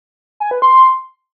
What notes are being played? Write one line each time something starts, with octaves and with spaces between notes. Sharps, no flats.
G#5
B4
C6